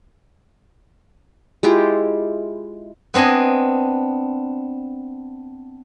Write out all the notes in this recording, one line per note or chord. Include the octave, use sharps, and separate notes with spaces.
G#3 E4 F4 G4
B3 C4 D4 D#5 G#5